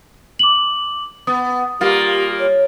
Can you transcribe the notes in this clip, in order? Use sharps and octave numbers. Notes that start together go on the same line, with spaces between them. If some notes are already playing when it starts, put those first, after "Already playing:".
D6 F#7
B3 D#6
G3 A#3 F4 G4
C#5